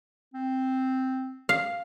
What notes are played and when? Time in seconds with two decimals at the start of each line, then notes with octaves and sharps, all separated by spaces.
0.34 C4
1.49 F5